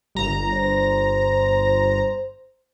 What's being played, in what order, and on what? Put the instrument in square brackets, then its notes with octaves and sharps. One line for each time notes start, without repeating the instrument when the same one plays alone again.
[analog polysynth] G1 A#5
[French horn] C5